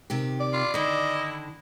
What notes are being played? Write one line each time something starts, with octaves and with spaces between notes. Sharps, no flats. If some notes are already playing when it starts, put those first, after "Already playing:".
C3 D#3 G4
D5
F4
D3 D#3 E4 D#5